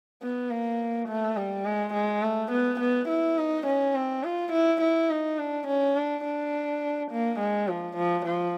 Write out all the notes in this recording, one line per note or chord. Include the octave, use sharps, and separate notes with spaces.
B3
A#3
A3
G3
G#3
G#3
A3
B3
B3
E4
D#4
C#4
C4
F4
E4
E4
D#4
D4
C#4
D4
D4
A#3
G#3
F3
F3
F3